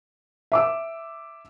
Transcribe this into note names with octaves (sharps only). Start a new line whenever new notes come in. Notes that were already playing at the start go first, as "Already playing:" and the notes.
E5 D6 E6